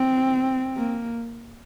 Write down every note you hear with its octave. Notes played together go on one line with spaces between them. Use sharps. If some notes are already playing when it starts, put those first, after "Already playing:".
Already playing: C4
A#3